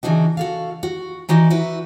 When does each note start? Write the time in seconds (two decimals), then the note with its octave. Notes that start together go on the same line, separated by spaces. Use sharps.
0.03 C#3 E3 D4 D#4 F#4
0.37 F#4 A4 F5
0.83 F#4
1.29 E3 D#4 F#4 D5
1.50 E4 F#4 B4